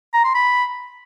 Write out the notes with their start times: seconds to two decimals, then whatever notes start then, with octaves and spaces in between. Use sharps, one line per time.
0.13 A#5
0.24 C6
0.35 B5